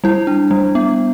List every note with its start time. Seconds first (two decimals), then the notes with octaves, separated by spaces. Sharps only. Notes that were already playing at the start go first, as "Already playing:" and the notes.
0.04 G3 E4
0.27 D4
0.51 G3
0.75 B3